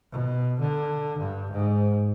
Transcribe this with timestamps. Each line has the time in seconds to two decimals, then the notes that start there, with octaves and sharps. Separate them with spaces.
0.12 B2
0.60 D3
1.19 G2
1.51 G#2